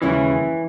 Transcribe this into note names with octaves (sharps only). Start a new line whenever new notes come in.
D#2 C#3 E3 G#3 C#4